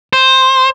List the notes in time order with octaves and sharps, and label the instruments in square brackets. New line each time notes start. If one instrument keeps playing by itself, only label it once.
[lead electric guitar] C5